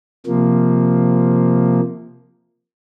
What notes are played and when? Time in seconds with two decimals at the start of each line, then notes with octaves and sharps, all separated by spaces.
0.26 C3 F3 A#3